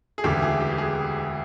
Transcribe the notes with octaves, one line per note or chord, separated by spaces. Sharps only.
G#4
E1 D2 C#3 E3 G4
G#4
G4
G4
G#4